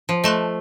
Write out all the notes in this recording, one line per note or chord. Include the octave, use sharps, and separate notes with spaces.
F3
A3 D#5 A5 C6 F#6